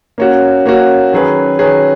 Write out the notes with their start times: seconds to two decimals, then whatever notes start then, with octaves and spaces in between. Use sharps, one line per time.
0.18 A#3 C#4 F#4
0.66 A#3 C#4 F#4
1.12 D#3 F#3 C#4 G#4 B4
1.59 D#3 F#3 C#4 G#4 B4